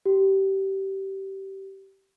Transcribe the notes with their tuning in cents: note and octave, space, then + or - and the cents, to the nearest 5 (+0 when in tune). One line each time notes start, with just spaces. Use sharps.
G4 -20